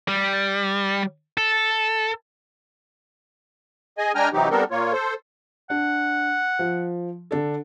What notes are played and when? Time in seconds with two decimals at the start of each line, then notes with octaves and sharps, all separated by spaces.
0.08 G3
1.37 A4
3.98 G#4 D#5 G#5
4.15 G#3 D4 G5 G#5 A#5 F6
4.33 C3 E3 F#3 C4 D#4 G4
4.51 G3 B3 C4 D4 A4 A#4
4.71 A#2 A#3 F4 C#5
4.93 A4 C5
5.70 D4 F#5
6.59 F3
7.31 D3 D4 A4